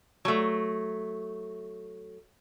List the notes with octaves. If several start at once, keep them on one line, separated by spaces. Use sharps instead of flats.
F#3 A3